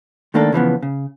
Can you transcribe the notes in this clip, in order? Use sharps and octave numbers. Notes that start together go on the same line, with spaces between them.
D#3 A3 A#3 D4 A4
C#3 E3 F3 B3
C#3